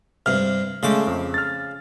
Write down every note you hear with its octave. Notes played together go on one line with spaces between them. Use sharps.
G2 C3 F6
C#3 G#3 A3 A5 D6
F2
F6 A6